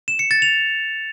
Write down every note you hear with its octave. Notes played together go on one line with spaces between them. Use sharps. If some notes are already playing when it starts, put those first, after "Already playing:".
E7
C#7
A6
F7